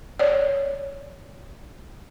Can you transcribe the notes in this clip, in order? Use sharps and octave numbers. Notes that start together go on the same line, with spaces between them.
C#5 D5